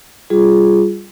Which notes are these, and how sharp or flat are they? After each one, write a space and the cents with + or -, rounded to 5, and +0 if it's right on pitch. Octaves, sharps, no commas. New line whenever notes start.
G3 +0 F4 +0 G#4 +0